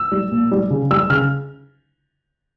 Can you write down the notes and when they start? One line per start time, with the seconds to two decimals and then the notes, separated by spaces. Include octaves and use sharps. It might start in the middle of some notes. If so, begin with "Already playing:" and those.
Already playing: E6
0.12 G3
0.31 A#2
0.51 G3
0.70 C#3
0.91 G3 E6
1.10 C#3 F6